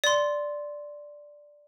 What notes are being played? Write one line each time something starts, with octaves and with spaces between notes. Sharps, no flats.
D5 C6